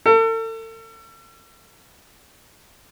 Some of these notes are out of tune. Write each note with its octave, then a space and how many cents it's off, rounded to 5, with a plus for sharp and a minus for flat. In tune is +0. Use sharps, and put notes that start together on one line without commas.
A4 +40